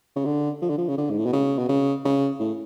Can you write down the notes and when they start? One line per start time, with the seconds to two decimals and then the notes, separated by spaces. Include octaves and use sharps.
0.16 C#3
0.25 D3
0.62 F3
0.69 D3
0.78 F3
0.88 C#3
0.98 D3
1.10 G#2
1.18 A2
1.26 B2
1.33 C#3
1.58 B2
1.69 C#3
2.05 C#3
2.40 A2